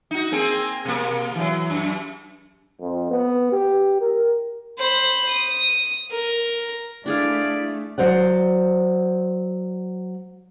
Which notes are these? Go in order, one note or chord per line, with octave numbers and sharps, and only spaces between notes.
D#4 F#4
A#3 C4 G#4
B2 A#3
E3 F#3
F#2
F2
B3
G4
A#4
C5 B5
D#6
A#4
A3 D4 E4 G#4 D5 F5
F#3 C5 D5 F#5